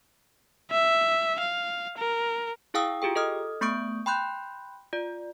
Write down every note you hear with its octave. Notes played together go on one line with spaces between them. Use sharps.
E5
F5
A#4
E4 G#4 F5 G5 D#6 E6
F4 G4 G#4 G5
A4 D#5 D#6 F6
A3 B3 C#6 D#6 G6 D7
G5 B5 C6 F#6 G6
F4 D5